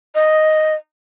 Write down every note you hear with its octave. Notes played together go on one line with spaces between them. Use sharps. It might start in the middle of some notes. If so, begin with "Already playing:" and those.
D#5